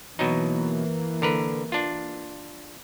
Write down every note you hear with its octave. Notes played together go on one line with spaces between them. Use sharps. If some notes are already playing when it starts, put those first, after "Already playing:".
B2 E3 F#3 A#3 D#4
D3 A#4 B4
D4 F4